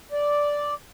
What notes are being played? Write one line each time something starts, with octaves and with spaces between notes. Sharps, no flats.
D5